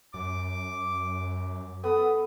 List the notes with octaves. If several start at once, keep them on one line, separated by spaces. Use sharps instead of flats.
F#2 D6
B3 A4 D#6